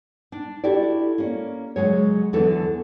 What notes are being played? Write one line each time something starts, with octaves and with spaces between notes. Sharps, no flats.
D4
E4 F#4 G4 A4 D5
A#3 C#4
C#3 F#3 G#3 C#5
E2 D3 E3 F#3 A4